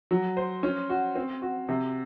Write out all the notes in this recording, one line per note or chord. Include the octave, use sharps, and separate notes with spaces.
F#3
C5
C#4
F#4
C4
F#4
C3